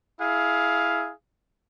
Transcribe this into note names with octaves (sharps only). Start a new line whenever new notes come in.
E4 G#4 F5